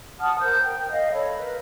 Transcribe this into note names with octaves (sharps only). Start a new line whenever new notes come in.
F#5 A5 D#6 F6
A#4 C5 G6
G5
D#5 F5
A4 C#5 B5
A#4 B4